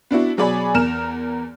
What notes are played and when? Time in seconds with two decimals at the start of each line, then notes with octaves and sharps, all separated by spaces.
0.11 B3 D4 E4 F#4
0.37 B2 F#3 G#4 D5 G#5 B5
0.75 E2 A#4 F6 E7